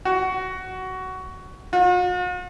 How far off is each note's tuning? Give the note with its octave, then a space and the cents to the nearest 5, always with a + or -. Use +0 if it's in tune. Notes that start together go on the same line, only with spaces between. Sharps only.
F#4 +15
F#4 -45